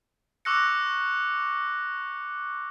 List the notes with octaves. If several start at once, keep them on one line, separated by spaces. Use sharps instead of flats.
C#6 D6 E6 F#6 A#6 C#7